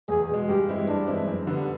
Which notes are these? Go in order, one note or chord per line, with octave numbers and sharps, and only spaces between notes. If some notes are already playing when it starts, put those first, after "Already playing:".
E2 G#4
B2 G#3
G2 G4
E3 G#3 C4 E4
G2 D4
E3 G#3 C4 E4
F#2
D3 G3 B3